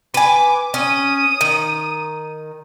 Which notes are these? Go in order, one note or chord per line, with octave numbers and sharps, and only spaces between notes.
B4 G#5 D6
C#4 D#6 D#7
D#3